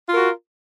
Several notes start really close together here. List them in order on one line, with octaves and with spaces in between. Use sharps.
F4 A#4 F#4